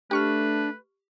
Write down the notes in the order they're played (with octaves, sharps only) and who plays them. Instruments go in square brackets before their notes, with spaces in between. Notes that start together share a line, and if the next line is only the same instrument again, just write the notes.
[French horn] A3 [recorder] D4 [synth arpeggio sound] G4 C#6 F6 [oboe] B4